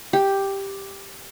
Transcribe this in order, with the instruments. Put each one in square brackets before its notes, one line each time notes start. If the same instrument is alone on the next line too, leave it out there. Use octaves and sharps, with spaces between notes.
[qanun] G4